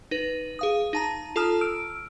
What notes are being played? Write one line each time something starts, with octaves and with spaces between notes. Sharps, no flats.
D#4 B4
G#4 F5 D#6
D#4 A5 A#5
F4 A4 A5 A#5 D#6 F6
E6 F6 D7